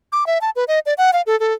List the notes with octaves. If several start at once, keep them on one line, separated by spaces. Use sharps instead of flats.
D6
E5
A5
B4
D#5
D5
F#5
F5
A4
A4